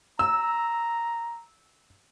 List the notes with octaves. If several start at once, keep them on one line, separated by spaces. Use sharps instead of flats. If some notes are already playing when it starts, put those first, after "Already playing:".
A#5 E6